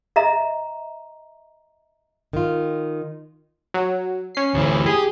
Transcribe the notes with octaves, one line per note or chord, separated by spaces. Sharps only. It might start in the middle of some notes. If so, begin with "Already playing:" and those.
D#5 E5 A#5
D#3 F4
F#3
C#4 C7
D2 E3
G4 G#4